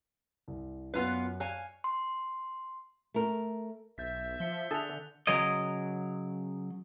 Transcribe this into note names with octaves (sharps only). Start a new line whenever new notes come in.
C2
F#2 B3 C#4 F4 B4
C#5 F5 G#5 F#6
C6
A3 A#4
B1 E5 G6 A6 B6
F3 C#7 G7
D3 G#4 A4 G#5 F#6 F7
C#3 F#3 A#4 C#5 D#5